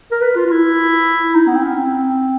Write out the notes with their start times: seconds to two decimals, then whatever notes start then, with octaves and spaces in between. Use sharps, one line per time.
0.12 A#4
0.21 B4
0.36 F4
0.46 F4
0.50 E4
1.35 D#4
1.47 B3
1.55 C4
1.63 C#4
1.77 C4